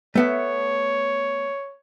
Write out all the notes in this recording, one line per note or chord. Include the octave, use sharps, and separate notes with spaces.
A3 B3 C#5 E5